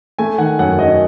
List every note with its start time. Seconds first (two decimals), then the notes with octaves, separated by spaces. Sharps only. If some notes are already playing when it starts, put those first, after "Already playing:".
0.19 A3 G#5
0.38 D#3 F#5
0.59 F#2 F#5
0.78 F#2 D#5